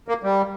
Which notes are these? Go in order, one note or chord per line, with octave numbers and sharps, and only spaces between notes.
A#3
G3